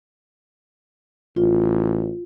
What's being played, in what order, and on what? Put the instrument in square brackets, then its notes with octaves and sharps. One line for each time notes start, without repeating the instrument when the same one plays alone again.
[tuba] A1 [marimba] F4